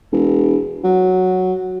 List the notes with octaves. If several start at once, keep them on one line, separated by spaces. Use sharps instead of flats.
E1
F#3